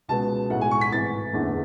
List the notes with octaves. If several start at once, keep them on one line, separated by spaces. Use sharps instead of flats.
C#2 B2 G#3 B3 A5
B1 A2 G#3 F#5
G#5
C#6
B6
G#1 G#2 E3 A6
F#1 E2 D3 A3